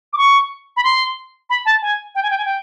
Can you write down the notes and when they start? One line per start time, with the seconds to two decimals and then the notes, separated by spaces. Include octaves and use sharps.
0.13 D6
0.18 C#6
0.77 B5
0.84 C6
1.50 B5
1.66 A5
1.82 G#5
2.15 G5
2.23 G#5
2.30 G5
2.38 G#5
2.45 G5